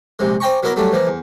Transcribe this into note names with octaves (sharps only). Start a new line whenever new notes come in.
A#1 C3 G#3
C5 D5 G5 G#5 A#5 C#6
F#3 B3 E4 A#4 D5 D#5
F#3 G3 A3 C#4 D4
E3 F3 A#3
E2